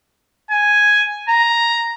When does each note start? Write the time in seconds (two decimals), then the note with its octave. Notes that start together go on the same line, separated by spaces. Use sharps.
0.51 G#5
1.29 A#5